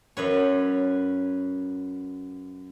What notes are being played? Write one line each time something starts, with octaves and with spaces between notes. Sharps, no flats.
F#2 B4 C#5